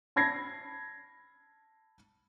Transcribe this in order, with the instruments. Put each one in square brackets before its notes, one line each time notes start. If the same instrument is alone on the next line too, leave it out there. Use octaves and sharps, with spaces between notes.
[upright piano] A5 B5 G#6 A#6 C7